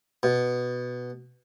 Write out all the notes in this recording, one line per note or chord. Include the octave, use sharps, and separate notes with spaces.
B2